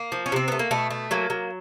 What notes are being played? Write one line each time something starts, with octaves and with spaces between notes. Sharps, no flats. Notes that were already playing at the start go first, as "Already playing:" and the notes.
Already playing: A#3
F3
C#4
C3 C4
A3 B3
A#3
B2 A3
A3
F#3 A#3
F#3